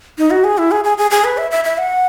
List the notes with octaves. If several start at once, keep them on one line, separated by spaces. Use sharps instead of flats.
D#4
F#4
G#4
E4
G#4
G#4
G#4
G#4
B4
E5
E5
E5
F#5